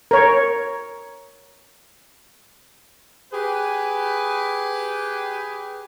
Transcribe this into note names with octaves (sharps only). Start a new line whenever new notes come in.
A#4 C#5
G4 G#4 B4